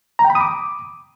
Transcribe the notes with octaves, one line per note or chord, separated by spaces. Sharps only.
A#5
G5
B5
D#6
D6